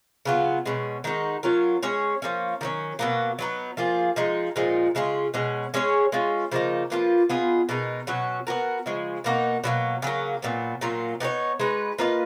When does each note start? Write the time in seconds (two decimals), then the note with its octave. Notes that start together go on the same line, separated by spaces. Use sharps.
0.25 C#3 F#3 B3 F4
0.66 B2 G#3 C#4
1.04 D#3 G#3 D#4 F#4
1.43 F#3 C#4 F4 A#4
1.83 G#3 C#4 G#4 C#5
2.22 F3 A#3 C#4
2.61 D#3 F#3 C#4
2.99 B2 F#3 A#3
3.39 F#3 B3 D#4
3.77 F3 A#3 F4 G#4
4.16 F3 G#3 D#4
4.56 A#2 F3 G#3 D#4
4.95 C#3 G#3 C#4 F4
5.34 B2 G#3 C#4
5.74 G#3 C#4 G#4 C#5
6.12 G#3 C#4 F4
6.51 C#3 F3 A#3 D#4
6.90 F3 A#3 F4 B4
7.29 B3 F4 G#4 D#5
7.69 B2 G#3 D#4 A#4
8.07 B2 F#3 C#4 F#4
8.47 B3 F#4 A#4
8.86 C#3 F3 G#3
9.24 B2 A#3 D#4 F#4
9.64 B2 F#3 A#3
10.02 C#3 F#3 A#3
10.42 A#2 F#3 B3
10.81 A#2 F#3 A#3 F4
11.20 B3 D#4 G#4 C#5
11.60 G#3 D#4 F#4 B4
11.99 A#3 F4 B4 D#5